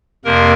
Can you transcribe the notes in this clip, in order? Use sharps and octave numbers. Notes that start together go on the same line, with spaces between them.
F2 C3 A#3 A#4